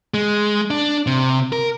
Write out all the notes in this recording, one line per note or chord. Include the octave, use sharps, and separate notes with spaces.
G#3
D4
C3
A#4